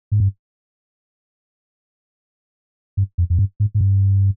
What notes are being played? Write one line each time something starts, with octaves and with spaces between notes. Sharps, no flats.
G#2
G2
G2
F2
F2
G2
G#2
G#2
G2